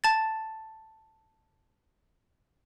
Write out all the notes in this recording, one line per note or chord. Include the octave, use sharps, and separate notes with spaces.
A5 A6